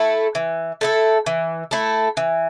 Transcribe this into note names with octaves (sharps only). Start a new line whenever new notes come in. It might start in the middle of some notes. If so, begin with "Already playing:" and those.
Already playing: A3 E4 A4
E3
A3 E4 A4
E3
A3 E4 A4
E3